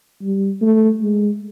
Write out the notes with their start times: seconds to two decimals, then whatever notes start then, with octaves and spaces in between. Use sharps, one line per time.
0.22 G3
0.61 A3
1.01 G#3